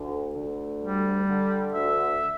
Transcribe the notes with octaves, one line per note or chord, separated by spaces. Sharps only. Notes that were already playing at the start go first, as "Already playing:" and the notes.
Already playing: D2 D3
D2
G3
D3
D2 E5